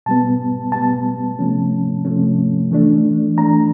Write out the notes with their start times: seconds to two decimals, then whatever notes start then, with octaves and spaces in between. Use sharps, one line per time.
0.06 B2 G3 B3 A5
0.72 B2 G3 B3 A5
1.39 C3 F3 A3 C#4
2.05 C3 F3 A3 C#4
2.71 E3 A3 D4
3.37 E3 A3 D4 A#5